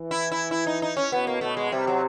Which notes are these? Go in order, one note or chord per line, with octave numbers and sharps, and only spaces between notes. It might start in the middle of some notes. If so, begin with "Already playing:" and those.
Already playing: E3
E4
E4
E4
D#4
D#4
C#4
B2 B3
A#3
B2 A3
G#3
C3 G3
F#3